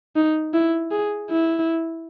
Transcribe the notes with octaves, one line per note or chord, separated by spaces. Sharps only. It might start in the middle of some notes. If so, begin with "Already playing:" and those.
D#4
E4
G#4
E4